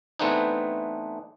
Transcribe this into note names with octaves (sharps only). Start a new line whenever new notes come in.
E3 A3 B3 C4 D4 D#4